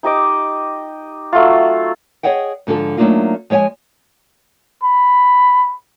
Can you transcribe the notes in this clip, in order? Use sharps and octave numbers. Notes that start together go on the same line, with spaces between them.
D#4 G4 D#5 D6
F#3 A3 F4
G#4 A4 C#5 D#5 F#5 G5
G#2 D3 F3 A4
F#3 A3 A#3 D4 D#4 F4
F3 G#3 C#5 G5 G#5
B5